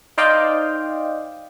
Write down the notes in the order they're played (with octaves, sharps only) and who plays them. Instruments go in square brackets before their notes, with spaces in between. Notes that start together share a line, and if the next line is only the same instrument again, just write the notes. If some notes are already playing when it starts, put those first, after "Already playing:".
[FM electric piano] D#4 C5 D5 D#5 F5 G5